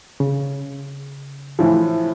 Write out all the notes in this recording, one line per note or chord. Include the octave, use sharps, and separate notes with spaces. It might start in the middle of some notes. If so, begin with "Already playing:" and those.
C#3
A2 E3 F3